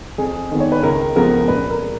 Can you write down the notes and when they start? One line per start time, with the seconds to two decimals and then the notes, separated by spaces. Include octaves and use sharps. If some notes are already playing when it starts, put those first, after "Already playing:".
0.18 F2 G#4
0.51 D#3 G#3 B3
0.60 C#5
0.72 B4
0.83 C#2 A#4
1.16 C#3 F3 G#3 B3 A#4
1.48 A#2 B4
1.71 A#4
1.82 G#3